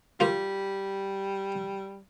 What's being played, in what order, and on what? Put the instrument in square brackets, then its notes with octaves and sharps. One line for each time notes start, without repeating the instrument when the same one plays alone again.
[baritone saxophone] G3 [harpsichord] A#3 F4